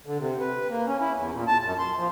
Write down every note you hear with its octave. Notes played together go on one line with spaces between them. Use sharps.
D3
C3
B4
A#3
C#4
E4
E2
A#2
A5
F#2
C6
F3